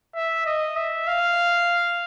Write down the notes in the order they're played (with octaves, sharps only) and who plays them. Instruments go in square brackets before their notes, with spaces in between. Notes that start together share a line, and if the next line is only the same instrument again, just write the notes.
[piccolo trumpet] E5
D#5
E5
F5